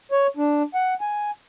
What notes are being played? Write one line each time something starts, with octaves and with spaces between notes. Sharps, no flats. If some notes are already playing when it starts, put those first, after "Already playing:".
C#5
D4
F#5
G#5